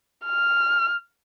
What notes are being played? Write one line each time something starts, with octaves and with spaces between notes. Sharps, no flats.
F6